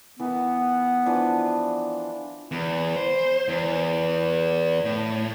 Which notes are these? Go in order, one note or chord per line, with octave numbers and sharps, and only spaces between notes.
E3 B3 A#4
E3 F3 D4
E2
C5
E2
A2